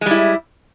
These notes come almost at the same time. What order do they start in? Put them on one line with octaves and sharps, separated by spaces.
G#3 G3 E4